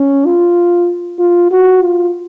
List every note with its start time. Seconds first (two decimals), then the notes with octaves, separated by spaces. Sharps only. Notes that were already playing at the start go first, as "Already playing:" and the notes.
Already playing: C#4
0.25 F4
1.19 F4
1.51 F#4
1.83 F4